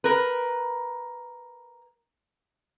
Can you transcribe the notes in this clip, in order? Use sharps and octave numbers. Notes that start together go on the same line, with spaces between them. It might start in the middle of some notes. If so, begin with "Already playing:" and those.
A#4 B4